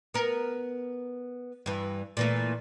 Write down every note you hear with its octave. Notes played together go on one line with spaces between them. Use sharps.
B3 A#4
G2 E3
A#2 E3 A3